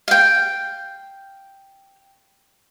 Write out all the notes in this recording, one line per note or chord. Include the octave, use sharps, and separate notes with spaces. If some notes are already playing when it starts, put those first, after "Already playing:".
F5 G5